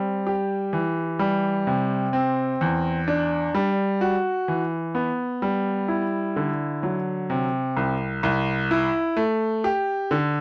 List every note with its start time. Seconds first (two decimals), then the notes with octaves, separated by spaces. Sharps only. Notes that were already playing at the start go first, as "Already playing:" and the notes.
Already playing: G3 C4
0.27 G4
0.73 E3
1.19 G3
1.67 C3
2.13 C4
2.61 E2
3.08 D4
3.55 G3
4.01 F#4
4.48 E3
4.95 B3
5.42 G3
5.88 E4
6.36 D3
6.83 F#3
7.30 C3
7.77 C2
8.23 C2
8.71 E4
9.17 A3
9.64 G4
10.11 D3